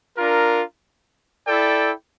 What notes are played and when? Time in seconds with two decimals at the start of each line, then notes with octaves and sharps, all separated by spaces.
0.18 D4 F4 A#4
1.47 E4 A4 D5 G5